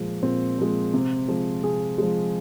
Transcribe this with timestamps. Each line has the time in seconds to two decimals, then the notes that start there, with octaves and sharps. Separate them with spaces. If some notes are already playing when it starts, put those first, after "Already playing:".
Already playing: A#2 F3 G#3
0.22 A#2 C4
0.58 F3 G#3
0.94 C3
1.28 F3 G#3
1.63 C3 G#4
1.98 F3 G#3